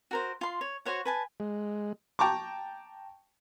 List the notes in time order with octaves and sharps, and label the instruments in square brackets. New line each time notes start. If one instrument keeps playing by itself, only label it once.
[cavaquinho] F#4 A#4 C5
F4 C6
C#5
F#4 C5 C#5 F#5
B4 G#5 A5
[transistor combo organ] G#3
[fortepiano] G5 A5 A#5 C#6 D6